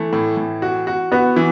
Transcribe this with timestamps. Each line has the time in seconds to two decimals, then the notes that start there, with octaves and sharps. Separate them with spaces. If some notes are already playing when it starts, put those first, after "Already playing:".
Already playing: E3 A3
0.13 A2
0.37 A2
0.62 F#4
0.87 F#4
1.12 B3 F#4
1.36 E3